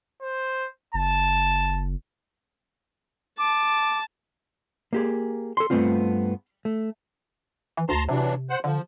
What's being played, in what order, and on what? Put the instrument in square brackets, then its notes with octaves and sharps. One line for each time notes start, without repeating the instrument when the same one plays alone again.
[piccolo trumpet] C5
[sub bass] F#1 [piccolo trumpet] A5
[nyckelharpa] A5 [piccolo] D6
[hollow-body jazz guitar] A#3 G4 G#4
A4 C6
G2 F#3 A3 B3 C4 F4
A3
[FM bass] E3
[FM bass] D2 [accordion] A5 A#5 C6
[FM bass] C3 [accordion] E3 F#3 D4
[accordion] C5 F#5
[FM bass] D3 [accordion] F3